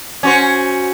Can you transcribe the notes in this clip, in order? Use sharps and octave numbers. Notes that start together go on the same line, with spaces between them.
C#4 F#4 C5